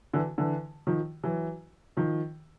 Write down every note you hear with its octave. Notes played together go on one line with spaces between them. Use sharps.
D3 E3
D3 E3
D#3 F3
E3 F#3
D#3 F3